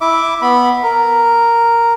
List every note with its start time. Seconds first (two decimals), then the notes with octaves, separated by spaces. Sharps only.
0.01 E4 E5 D6
0.42 B3 B5
0.83 A#4